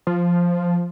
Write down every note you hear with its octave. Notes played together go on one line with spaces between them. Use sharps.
F3